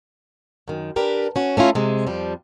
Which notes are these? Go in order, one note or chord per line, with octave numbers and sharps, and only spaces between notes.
F#2 D#3
D4 G4 A#4 B4
C#4 F#4
A3 C#4 E4 F4
C3 G#3
F2 F3 G3